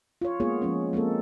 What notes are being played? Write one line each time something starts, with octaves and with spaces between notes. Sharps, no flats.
F4 C#5
G#3 A#3 B3 F4 G#4 C#5
F3 G#3 C#4
G#3 A#3 C4 A4